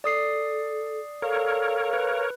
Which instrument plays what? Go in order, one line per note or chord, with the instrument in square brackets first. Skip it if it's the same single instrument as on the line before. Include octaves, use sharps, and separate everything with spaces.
[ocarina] A4 [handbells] D5 D#6 C7
[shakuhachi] A4 [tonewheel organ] A#4 C#5 [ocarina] F5
[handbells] B4